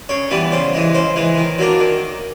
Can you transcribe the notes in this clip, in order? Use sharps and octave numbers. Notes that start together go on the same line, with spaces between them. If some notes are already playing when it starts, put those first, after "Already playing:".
C#3 C#5
E3 G3 B3
C#3 C5
E3 G#3
C#3 C5
E3 G#3
D#3
F#3 A#3 D4
D#3